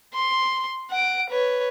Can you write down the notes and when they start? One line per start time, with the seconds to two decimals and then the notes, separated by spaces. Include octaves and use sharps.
0.14 C6
0.91 F#5 D7
1.30 B4 C#5